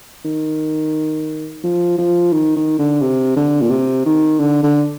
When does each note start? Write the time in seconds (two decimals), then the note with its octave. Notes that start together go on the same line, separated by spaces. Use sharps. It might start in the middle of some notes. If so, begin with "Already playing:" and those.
0.25 D#3
1.63 F3
1.98 F3
2.32 D#3
2.56 D#3
2.79 D3
3.01 C3
3.36 D3
3.61 A#2
3.70 C3
4.06 D#3
4.40 D3
4.63 D3